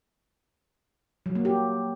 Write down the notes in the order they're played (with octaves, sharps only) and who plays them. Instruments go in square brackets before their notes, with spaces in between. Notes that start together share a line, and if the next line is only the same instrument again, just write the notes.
[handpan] F#3
A#3
G4